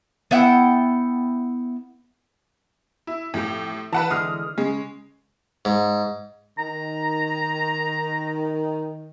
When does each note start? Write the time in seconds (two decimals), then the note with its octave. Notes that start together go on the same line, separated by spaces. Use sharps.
0.31 B3 E4 F#5 G5
3.07 E4
3.34 F2 A2 G4
3.93 E3 B4 F#5 A5
4.10 D3 E3 G#3 D#6 F6
4.58 C#3 G#3
5.65 G#2
6.58 D#3 A#5